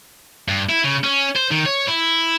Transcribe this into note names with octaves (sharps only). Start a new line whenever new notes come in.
G2
E4
C#3
C#4
C5
D#3
C#5
E4